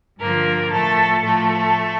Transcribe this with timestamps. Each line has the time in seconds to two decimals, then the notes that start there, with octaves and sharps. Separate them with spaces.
0.19 G2 D3 F3 A#3 A#4
0.71 A2 F3 A3 A4
1.24 A2 F3 A3 A4